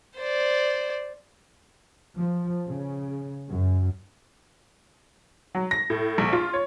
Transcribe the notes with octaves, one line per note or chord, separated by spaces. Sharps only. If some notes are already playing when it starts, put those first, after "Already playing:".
C5 D5
F3
C#3
F#2
F#3
A#6
A2
A#1
F4
C#5